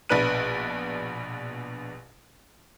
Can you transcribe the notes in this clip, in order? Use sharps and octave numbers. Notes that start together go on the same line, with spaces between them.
A#1 B2 D4 B4 F#6 D#7